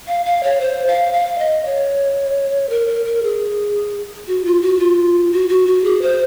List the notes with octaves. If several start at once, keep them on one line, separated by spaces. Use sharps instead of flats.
F5
F5
C#5
C5
F5
F5
D#5
C#5
A#4
A#4
A#4
G#4
F#4
F4
F#4
F4
F#4
F#4
F#4
G#4
C5